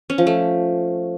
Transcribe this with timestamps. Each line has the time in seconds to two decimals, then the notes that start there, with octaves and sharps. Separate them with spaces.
0.10 C#4
0.18 F3
0.27 A3